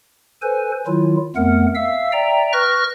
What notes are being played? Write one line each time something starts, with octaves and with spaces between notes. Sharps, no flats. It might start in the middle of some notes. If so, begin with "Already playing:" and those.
A4 B4 C5 G#5
D#3 F#3 E4 F4
F2 A3 B3 A#4 F#5
E5 F5 E6
D5 E5 G5 A#5
B4 C#6 F6 F#6 A#6